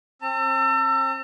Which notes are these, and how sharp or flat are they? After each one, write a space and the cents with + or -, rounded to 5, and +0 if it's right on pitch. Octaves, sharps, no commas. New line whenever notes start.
C4 +40 A5 +45